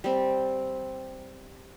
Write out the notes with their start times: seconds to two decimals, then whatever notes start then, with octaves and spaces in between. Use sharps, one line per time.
0.04 G3 C4